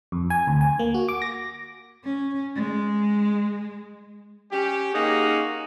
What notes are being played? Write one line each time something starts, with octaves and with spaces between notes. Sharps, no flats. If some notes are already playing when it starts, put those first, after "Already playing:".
F2
G#5
D2
G#5
A#3
F#4
D6
A#6
C#4
G#3
C#4 G4
A#3 C#4 D#4 G#4 F#5